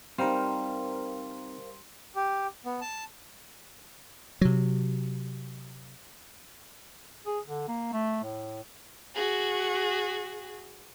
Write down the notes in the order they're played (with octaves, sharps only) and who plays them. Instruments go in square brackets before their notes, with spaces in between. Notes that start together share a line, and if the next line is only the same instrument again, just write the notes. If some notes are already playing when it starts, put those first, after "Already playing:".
[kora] G3 [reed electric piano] C4 D#4 [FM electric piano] A#4 C5 F5 [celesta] C6
[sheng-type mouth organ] G4
B3
A5
[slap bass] C3 F#3
[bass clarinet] G#4
D3
A#3
A3
A2
[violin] F#4 G#4